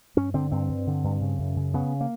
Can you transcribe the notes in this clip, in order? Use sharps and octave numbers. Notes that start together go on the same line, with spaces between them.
G2 C#4
D3 C4
G2 C4
G2
D3
G2
C#3
F#2
C#3
C#3 B3
A#3